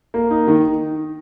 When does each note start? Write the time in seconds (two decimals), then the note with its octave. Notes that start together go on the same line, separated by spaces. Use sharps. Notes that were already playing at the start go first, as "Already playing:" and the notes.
0.14 A#3
0.31 D#4
0.47 D#3